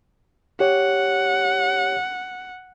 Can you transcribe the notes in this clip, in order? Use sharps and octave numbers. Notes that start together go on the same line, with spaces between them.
G4 C#5 F#5